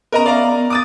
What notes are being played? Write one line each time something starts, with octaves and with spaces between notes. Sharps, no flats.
B3 C#4 A#4 D#5 A#5
D5 E5 F5 A#5 D6
B3
D6 D#6 A6